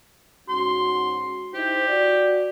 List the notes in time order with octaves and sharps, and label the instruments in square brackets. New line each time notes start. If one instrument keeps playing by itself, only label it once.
[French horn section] G#2 C#4 F#4 [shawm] C6
[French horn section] D#4 E4 C5 [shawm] G4
[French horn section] F#4 D5